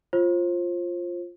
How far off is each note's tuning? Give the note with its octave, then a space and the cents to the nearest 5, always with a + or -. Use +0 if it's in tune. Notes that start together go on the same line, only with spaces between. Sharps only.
F4 +0 C5 +30